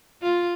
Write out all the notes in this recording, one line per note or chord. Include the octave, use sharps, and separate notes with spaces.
F4